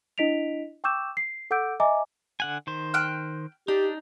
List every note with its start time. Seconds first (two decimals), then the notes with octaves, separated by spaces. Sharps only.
0.18 D4 E4 D#5 B6 D7 F7
0.84 G5 C#6 D6 E6 G6 E7
1.17 C7
1.51 A4 F#5 D6 E6 G6 D7
1.80 D#5 E5 G#5 A#5 D6
2.40 D3 F#5 G#5
2.67 D#3 C5
2.94 G5 F6 F#6
3.68 D4 D#4 G4